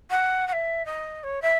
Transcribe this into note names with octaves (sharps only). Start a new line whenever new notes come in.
F#5
F#5
E5
D#5
C#5
E5